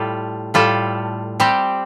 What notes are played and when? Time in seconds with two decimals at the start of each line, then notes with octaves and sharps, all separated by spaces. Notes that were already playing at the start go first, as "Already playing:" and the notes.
Already playing: A2 G3 F4 A4
0.54 A2 G3 F4 A4
1.40 G3 C4 G4